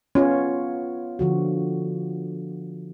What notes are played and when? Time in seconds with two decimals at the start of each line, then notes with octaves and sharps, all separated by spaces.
0.15 B3 C#4 F4 C#5
1.19 D3 F3 F#4